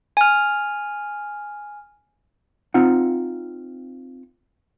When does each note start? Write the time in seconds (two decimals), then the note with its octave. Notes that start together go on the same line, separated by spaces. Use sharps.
0.17 G#5 F6
2.74 C4 D#4 F4 F#5